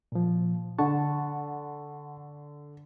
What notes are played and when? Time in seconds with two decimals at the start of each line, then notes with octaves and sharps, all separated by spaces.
0.12 A#2 F3
0.78 D3 F#5 A5 C#6